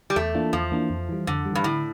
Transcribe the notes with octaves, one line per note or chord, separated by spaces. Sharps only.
G3
E2 A3
E3 A#3 D4 F4
E2 F3
E3 A#3 D4 F4
F2
E3 G3
F2 D3
E3 G3
G2
A2 D3